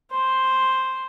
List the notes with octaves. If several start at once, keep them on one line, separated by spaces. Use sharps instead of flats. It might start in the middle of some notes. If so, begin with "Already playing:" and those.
C5